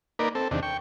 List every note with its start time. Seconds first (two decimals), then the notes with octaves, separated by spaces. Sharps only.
0.19 A#3 D#4 A#4 B4 D5
0.35 C4 A4
0.51 E2 C3 D#3 D4
0.63 G5 C#6